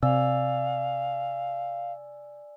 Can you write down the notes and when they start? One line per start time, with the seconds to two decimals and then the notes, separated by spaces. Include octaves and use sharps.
0.03 C3 D5 F5 G#5 E6